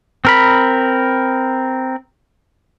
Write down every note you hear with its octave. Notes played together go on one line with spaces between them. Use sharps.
C4 A#4 B5